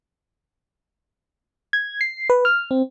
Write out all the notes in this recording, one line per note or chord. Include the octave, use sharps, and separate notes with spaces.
G#6
C7
B4
F6
C4